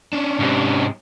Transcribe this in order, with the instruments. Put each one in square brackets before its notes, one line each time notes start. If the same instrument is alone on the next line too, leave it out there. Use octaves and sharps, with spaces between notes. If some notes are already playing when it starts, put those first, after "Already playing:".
[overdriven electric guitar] C#4 D4
[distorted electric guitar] G#2 C3